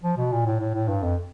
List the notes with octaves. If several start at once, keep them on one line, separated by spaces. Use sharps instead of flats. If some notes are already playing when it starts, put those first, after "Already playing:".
F3
B2
A#2
A2
A2
A2
G2
F2